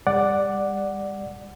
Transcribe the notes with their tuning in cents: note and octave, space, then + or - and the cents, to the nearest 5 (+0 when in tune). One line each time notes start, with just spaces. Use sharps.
G3 +40 D5 +0 F#5 +0